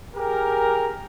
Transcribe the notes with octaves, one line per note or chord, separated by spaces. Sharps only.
G4 G#4 A#4